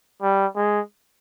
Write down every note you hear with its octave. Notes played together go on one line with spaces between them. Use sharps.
G3
G#3